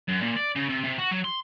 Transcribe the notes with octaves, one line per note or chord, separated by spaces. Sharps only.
F#2
A#2
D5
C#3
C3
C3
F#4
F#3
C6